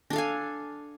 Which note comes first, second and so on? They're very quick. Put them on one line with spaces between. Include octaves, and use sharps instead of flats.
D4 A4 F5 G#5